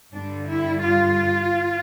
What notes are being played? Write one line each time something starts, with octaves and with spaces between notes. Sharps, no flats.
G2 D3 G3 D4
E4
F4